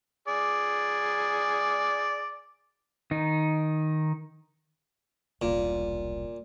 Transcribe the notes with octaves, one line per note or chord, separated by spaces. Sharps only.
G#4 D5
D#3 D#4
E1 C2 A#2